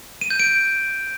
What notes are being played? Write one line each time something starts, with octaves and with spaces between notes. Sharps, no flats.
D#7
G6
D7